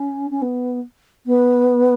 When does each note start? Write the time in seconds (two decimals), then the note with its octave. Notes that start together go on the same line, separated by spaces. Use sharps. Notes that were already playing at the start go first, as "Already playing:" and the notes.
Already playing: C#4
0.30 C#4
0.42 B3
1.26 B3